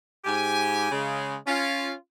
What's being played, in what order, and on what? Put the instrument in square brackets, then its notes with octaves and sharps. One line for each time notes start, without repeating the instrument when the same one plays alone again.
[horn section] G#2 G4 G#5
C#3 G#3
C#4 F4 F5